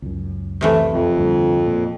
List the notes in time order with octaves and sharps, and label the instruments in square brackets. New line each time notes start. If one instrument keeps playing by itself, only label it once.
[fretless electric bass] C#2 F#2
[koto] C3 E3 A3
[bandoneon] F2
[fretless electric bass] D2 G2
A#2